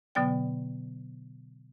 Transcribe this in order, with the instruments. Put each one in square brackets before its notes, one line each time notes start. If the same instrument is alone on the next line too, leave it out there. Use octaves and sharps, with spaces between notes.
[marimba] B2 D3 F#3 B3 D5 G5